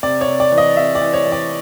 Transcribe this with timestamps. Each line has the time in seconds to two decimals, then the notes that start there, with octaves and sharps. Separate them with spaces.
0.03 C3 D5
0.21 C#5
0.28 C3
0.40 D5
0.52 E3
0.58 D#5
0.77 C3 E5
0.95 D5
1.01 E3
1.14 C#5
1.26 E3
1.32 D5